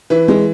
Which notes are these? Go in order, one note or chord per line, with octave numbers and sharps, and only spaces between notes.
E3 B4
G#3